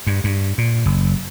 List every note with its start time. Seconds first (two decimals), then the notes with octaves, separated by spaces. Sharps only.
0.07 G2
0.24 G2
0.58 A#2
0.86 F#1